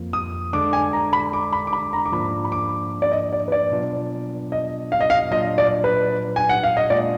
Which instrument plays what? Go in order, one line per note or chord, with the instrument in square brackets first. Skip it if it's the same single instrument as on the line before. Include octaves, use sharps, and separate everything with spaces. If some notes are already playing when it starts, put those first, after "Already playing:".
Already playing: [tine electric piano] F2 F3 A#3 F4
[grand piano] D#6
[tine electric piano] D3 G#3 D4 [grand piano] D6
[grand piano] G#5
A#5
B5
D6
B5
D6
B5
A#5
D6
[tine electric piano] G#2 F3 A#3 D4 F4 [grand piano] B5
[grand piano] B5
D6
D5
D#5
D5
B4
D5
[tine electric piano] B2 F#3 B3 D4 F4
[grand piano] D#5
F5
D#5
F5
[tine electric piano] A#2 F#3 D4 F4 [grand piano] D#5
[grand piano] D5
B4
G#5
F#5
F5
D#5
[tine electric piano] A#2 G#3 D4 F4 [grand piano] D5